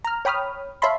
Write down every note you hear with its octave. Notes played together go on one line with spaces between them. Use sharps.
A#5 F6
C#5 G5 B5 D#6 F6
C#5 E5 F5 A5 B5 C6